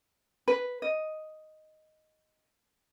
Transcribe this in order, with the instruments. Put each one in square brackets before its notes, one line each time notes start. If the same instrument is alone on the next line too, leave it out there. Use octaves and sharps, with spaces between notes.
[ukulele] B4
D#5